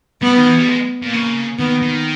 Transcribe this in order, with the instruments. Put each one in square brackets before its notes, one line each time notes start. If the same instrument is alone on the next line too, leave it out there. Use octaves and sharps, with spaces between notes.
[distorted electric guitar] G3 [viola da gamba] B3
[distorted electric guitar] D#3
E3
G3
G#3
A#2
[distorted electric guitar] C#3 [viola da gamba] A#3
[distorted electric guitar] D#3 [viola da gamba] B3
[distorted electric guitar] D#3